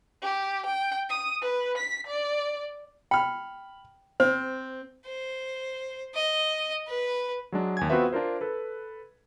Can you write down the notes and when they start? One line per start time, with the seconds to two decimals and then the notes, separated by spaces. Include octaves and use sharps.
0.22 G4
0.66 G5
1.09 D#6
1.41 B4
1.77 B6
2.07 D5
3.11 G5 B5 F6
4.20 C4 C5
5.06 C5
6.15 D#5
6.88 B4
7.52 F#3 G#3 D4
7.77 D#2 G#5 G#6
7.90 B3 C4 F4 F#4 B4 E5
8.12 D4 F4 A#4 C5
8.41 A4 B4